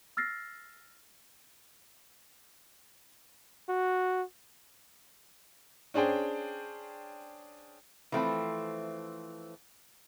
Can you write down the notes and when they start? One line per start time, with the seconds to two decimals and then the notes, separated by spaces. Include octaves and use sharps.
0.17 E6 F6 A6 A#6 C7
3.69 F#4
5.94 C#4 D4 G#4 C5 G5
8.12 E3 F3 A3 C4